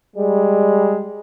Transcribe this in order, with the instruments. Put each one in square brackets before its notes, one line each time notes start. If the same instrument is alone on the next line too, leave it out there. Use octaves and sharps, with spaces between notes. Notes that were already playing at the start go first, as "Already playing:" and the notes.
[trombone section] G3 G#3